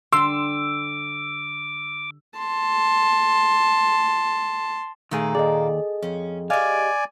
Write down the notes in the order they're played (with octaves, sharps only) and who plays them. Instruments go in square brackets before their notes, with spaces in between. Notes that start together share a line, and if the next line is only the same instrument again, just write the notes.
[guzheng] D3 G3 [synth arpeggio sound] C6 [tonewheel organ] D6 [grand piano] E6
[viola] A5 C6
[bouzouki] A#2 A#3 [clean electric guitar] D#3 A3 G#4
[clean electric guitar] D#2 D5 [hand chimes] G#4 A4 D#5
[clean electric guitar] F2 [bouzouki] C#4
[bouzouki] G#3 G4 [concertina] D5 G#5 [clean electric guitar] F5